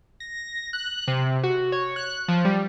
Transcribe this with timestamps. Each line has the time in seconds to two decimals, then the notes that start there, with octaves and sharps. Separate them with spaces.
0.20 A#6
0.73 F#6
1.08 C3
1.44 F#4
1.72 C#5
1.96 F#6
2.28 F3
2.45 G3